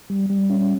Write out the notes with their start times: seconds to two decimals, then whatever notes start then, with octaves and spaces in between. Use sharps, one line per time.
0.10 G3
0.30 G3
0.50 C#4